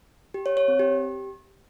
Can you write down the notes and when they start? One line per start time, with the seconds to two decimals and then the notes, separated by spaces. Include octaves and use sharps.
0.34 G4
0.46 C#5
0.57 C#5
0.68 C4
0.79 G4